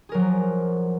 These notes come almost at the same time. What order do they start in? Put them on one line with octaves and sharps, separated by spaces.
G#4 A#4 F#3 F3